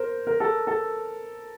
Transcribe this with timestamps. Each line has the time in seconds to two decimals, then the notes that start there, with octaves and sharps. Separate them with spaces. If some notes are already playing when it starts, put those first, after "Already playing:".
Already playing: A#4 C5
0.27 A#4
0.40 A4
0.67 A4